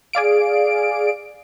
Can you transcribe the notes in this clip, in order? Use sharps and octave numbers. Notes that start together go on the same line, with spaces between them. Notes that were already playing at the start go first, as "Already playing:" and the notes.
G#4 D5 F5 D7